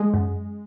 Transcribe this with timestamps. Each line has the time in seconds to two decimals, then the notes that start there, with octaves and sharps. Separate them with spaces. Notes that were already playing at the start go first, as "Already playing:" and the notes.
Already playing: G#3
0.14 F#2